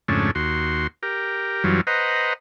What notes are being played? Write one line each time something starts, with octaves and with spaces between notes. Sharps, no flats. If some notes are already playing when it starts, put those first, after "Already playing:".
F2 G#2 C#3 A3 C#4 D4
D#2 F#4 C6
G4 A#4
F#2 E3 F#3 G3 F4
B4 C5 D#5 F#5 A#5